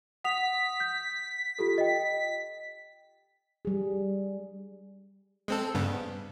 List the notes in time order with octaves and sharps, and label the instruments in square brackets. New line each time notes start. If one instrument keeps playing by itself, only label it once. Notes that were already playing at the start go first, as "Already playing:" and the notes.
[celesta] F#5 D#6 F7 [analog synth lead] B6
[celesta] G6
F4 G4 A4
D#5 G5
[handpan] G3 G#4
[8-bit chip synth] G#3 C4 A4
G2 C#3 B3